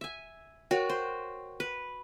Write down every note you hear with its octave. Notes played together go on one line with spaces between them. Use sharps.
E5 G#5
F#4 A#4 C#5 G5
C5
B4